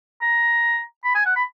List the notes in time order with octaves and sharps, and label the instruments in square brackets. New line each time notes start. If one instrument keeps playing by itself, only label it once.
[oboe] A#5
B5
G#5
F#5
B5